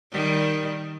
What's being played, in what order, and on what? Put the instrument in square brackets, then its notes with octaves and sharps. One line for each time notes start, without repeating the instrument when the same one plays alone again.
[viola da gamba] D#3 G3